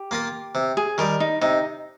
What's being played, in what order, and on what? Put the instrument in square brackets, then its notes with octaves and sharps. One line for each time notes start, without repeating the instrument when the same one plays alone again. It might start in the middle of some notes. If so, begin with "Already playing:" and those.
Already playing: [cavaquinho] G4
[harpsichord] A#3 F4 A#4
C3
[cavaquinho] G#4
[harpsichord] D#3 G3 [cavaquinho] A#4
[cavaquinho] D#4
[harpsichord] C3 [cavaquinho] D#4